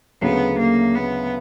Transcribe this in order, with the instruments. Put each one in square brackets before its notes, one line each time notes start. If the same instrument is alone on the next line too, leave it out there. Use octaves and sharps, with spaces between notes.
[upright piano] D2 C#3 F#3 [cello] B3
[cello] A#3
B3